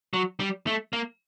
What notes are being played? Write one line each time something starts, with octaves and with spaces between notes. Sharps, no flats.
F#3
G3
A3
A#3